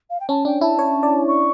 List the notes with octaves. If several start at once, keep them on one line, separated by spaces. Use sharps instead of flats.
F5
G5
C#4 A5
D4 G5
E4 A5
C#5
D5
C#6